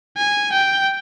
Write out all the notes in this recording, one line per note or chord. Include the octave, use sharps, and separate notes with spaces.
G#5
G5